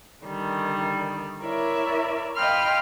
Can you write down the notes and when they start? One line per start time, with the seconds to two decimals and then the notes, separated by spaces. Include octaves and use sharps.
0.25 D3 D#3 G3
1.42 E4 A#4 C#5 D5 E5
2.36 D#5 F5 G5 B5 C6 F6